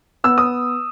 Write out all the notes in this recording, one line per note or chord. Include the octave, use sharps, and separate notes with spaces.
B3 E6
D#6